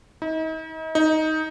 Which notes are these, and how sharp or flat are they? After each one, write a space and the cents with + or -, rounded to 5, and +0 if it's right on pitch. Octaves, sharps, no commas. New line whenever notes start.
D#4 +40
D#4 +10